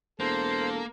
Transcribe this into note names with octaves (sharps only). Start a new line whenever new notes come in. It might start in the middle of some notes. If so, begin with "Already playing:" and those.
E1 A#3 A4 C5